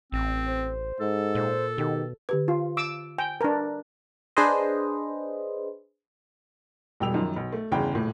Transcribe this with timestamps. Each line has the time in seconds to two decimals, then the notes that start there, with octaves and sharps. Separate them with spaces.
0.12 A1 C4
0.47 C5
1.01 G#2 A4
1.35 A#2 C5
1.78 B2 D#3 G4
2.29 D3 G4 B4
2.48 F4
2.77 D6 E6
3.18 G5 G#5
3.41 D4 A#4 B4 A5
4.37 D4 G#4 B4 C5 D#5
7.00 E1 G3 G5 E6 F7
7.14 F#2 D#3 F3
7.36 B1
7.52 A3
7.72 G1 E2 C#3 G5
7.94 D#1 A2